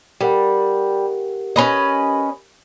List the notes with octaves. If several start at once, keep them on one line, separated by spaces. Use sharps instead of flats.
G3 G4 A#4 F#5
C#4 B4 D#5